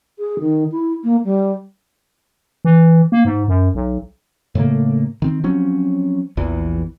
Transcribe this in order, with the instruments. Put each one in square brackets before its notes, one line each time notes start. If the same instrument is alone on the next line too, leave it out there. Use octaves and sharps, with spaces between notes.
[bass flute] G#4
D#3
E4
A#3
G3
[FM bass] E3
A#3
G#2
F#2
B1
[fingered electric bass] A2 C#3 A3 A#3
D#3 C4
F3 F#3 C4 C#4
A#1 E2 E3